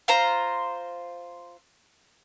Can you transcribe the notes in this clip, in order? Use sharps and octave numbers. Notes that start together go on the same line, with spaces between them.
F4 C5 A#5